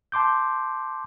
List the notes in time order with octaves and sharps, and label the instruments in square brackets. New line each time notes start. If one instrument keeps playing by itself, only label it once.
[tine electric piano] A5 C6 D6 G6